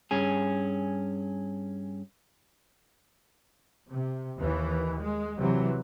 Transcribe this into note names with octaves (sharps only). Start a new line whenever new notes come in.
G2 C#4 G#4
C3
D#2 E3
G#3
C3 E3 F#3